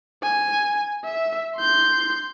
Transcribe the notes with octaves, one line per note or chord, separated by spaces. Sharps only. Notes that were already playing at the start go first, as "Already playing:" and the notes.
G#5
E5
C6 G6